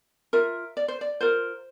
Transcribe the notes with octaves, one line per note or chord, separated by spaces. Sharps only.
F4 A#4 E5
D5
C5
D5
F4 A#4 C5